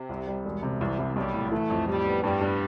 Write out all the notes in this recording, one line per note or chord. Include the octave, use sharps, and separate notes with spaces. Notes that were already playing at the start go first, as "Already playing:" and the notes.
Already playing: C3
C2
G3
E1
C3
C2 E3
C2
B1 G3
A2
E3 A3
F2
A2 G3
B3
G2 G3
G2